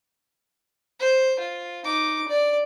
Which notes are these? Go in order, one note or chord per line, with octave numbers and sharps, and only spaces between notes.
C5
F4
D#4 D6
D5